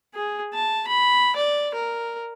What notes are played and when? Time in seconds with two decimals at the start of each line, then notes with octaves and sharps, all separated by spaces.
0.15 G#4
0.54 A5
0.88 B5
1.36 D5
1.74 A#4